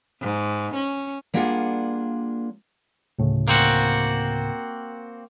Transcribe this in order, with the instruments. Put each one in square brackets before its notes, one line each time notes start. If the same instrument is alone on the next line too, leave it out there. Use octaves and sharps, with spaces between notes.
[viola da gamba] G#2
C#4
[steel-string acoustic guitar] G3 A#3 D4 F4 G#4 F#5
[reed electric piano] D2 A2 C#3
[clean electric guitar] A#3 C4 F#4